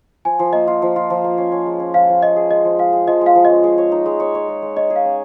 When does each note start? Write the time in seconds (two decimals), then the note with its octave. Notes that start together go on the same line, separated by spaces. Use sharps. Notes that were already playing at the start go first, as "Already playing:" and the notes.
0.25 F3 G#5
0.39 F3
0.53 A#3 D#5
0.67 F4
0.82 F3
0.96 F4
1.10 F3
1.24 A#3
1.38 C#4
1.52 C#4
1.66 G#3
1.80 C#4
1.94 F3 F5
2.08 F3
2.23 G#4 D#5
2.36 G#4
2.50 G#3 D#5
2.65 F3
2.78 G#3 F5
2.92 G#3
3.07 F3 D#5
3.21 G#3
3.26 F5
3.35 F3
3.45 C#4 D#5
3.64 G#3
3.78 C#5
3.92 D#4
4.06 G#3
4.20 C#5
4.35 C#5
4.48 G#3
4.62 G#3
4.76 C#5 D#5
4.90 G#4
4.96 F5
5.05 C#4